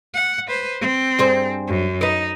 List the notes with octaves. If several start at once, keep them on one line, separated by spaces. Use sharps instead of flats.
F#5
B4 C5
C4
G2 G#4 C5
F#2
D#4 B4 D#5